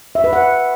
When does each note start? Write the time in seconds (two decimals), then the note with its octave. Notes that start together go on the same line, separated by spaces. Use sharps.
0.15 E5
0.24 B4
0.33 F#5